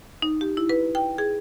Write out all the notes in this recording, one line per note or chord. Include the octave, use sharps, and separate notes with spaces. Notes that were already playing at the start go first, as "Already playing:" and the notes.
D#4
G4
E4
B4
G5
G#4